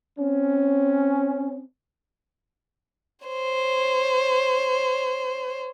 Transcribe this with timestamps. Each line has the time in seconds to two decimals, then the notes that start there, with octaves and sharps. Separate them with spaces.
0.19 C4 C#4
3.26 C5 C#5